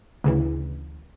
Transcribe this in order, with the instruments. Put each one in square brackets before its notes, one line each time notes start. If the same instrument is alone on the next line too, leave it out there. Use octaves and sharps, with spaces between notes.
[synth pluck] D2 C#3 E3